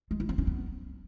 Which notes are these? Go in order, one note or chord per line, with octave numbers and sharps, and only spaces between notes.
G#3
E4
C4
C#4
B3